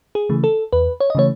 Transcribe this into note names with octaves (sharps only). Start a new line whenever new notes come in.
G#4
C#3 E3 A3
A4
E2 B4
C#5
D#5
C#3 E3 A3 C#5